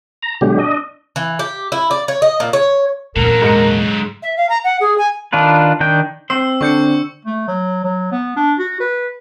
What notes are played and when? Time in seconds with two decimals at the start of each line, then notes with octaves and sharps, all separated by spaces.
0.23 A#5
0.41 B2 D3 F#3 G#3 G4
0.59 D4 D#5
1.16 E3
1.39 G4
1.72 E4
1.91 D5
2.08 C#5
2.22 D#5
2.40 A#2
2.53 C#5
3.16 E2 A#2 D3 F#3 A#4
3.42 G#2 C#7
4.23 E5
4.37 F5
4.49 A#5
4.64 F#5
4.80 G#4
4.98 G#5
5.33 D#3 D4 F4 B4
5.80 D#3 D4 G5
6.30 C4 C5 E6
6.61 D3 D4 C#6 G6 C#7
7.25 A3
7.48 F#3
7.84 F#3
8.12 B3
8.37 D4
8.59 F#4
8.80 B4